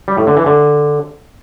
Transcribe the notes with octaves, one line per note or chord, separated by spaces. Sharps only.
G3
A2
D3
E3
D3